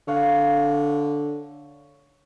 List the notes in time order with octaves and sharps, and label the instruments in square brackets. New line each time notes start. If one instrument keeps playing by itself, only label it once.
[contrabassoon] D3 [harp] C#5 F5 F#6